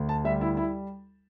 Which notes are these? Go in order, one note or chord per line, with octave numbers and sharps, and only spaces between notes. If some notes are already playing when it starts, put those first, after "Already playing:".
Already playing: D2
A5
G3 E5
E4
E4